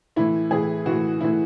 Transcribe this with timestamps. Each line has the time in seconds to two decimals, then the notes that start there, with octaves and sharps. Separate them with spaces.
0.16 A2 E3 E4
0.51 A2 E3 G#4
0.86 A2 E3 F#4
1.21 A2 E3 E4